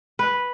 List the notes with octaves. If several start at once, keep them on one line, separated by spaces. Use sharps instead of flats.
B4